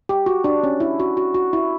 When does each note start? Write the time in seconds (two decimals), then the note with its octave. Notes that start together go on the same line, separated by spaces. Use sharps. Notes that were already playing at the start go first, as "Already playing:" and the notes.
0.09 G4
0.26 F#4
0.44 D4
0.63 C#4
0.80 E4
1.00 F#4
1.17 F#4
1.34 F#4
1.53 E4